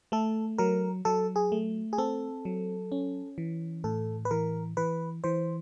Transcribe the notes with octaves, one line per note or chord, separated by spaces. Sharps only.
A3 A4
F#3 A#4
F#3 A4
G#4
A3
G#4
C4 A4
F#3
C#4
E3
A2 A4
B4
E3 A#4
E3 B4
E3 C5